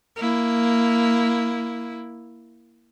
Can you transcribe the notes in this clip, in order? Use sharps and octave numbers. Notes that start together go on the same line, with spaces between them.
A#3 E4